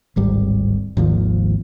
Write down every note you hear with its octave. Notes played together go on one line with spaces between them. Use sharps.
D1 G#1 G3
G#1 D#2 F3